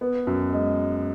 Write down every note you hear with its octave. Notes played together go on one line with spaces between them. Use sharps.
B3
F#2
G#3